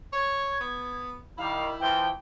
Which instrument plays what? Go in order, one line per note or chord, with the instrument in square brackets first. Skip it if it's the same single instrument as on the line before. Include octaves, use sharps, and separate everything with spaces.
[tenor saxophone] C#5 [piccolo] G#6
[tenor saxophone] B3
[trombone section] D#3 G3 [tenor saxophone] E4 [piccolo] F5
[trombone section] E3 F3 [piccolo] G5